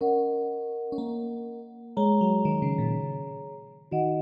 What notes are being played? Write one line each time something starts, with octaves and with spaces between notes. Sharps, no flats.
C#4 A#4 D#5 F#5
C#4
A#3
G#3 G#4 C#5 A#5
F#3
D#3
C#3
A#2
D#3 F#4 D#5 F#5